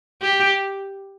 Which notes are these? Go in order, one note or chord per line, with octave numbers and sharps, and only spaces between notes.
G4